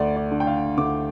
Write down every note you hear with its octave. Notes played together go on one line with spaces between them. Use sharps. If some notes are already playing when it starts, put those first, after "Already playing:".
Already playing: D2 D5
D5
D3
G5
F5
D2 D6